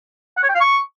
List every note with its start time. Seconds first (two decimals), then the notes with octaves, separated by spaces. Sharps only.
0.37 F#5
0.43 C#5
0.49 G5
0.55 F5
0.61 C#6